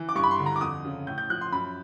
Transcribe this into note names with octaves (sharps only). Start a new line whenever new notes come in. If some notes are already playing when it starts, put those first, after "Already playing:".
Already playing: E3
D6
G2 C#6
B5
C6
D3
A#5
D6
F2 D#6
C#3
A2 G6
G6
F3 F#6
C6
F#2 B5